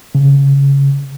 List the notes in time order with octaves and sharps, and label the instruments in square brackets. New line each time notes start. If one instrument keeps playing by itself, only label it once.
[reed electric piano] C#3